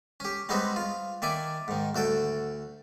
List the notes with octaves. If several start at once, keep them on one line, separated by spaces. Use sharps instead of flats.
C#4 G4
G3 G#3 B3 C4 D#4 F#4
F4
D#3 D5 E5 G#5 D6
G#2 D#3
D2 F#4 A4 G5